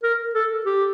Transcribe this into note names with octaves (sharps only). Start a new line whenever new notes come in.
A#4
A4
G4